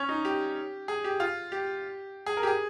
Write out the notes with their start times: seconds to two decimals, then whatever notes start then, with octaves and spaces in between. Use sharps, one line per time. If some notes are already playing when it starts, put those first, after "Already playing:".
Already playing: C#4
0.09 D#4
0.25 G4
0.88 G#4
1.04 G4
1.20 F4
1.52 G4
2.26 G#4
2.37 A#4
2.43 G4
2.47 G#4